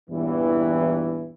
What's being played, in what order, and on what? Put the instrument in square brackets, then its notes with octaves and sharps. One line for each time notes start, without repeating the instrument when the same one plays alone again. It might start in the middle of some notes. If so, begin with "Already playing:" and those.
[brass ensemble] E2 G2 A#2 E3